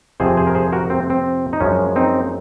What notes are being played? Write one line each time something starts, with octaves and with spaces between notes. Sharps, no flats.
F2 C3 F3 C4 G#4 C5
G#4 C5
A#4
G#4 C5
F#4 A#4
C4
C4
D#4
F#2 F3 G#3 C#4
C4 D#4